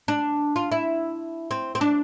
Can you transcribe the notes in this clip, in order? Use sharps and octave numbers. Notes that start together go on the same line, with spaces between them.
D4
F4
E4
C4
C4
D4